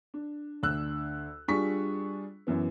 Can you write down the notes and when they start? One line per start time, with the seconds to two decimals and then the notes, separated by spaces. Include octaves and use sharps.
0.14 D4
0.63 D2 D4 E6 F#6
1.48 G3 D4 F4 G#4 C#6 B6
2.47 F#2 E3 B3